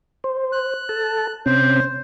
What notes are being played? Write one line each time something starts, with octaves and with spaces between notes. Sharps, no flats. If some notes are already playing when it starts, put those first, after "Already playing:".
C5
F#6
A4 A5
C3 C4 C#4 C5